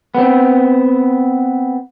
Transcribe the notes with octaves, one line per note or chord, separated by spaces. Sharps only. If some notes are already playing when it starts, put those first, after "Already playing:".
B3 C4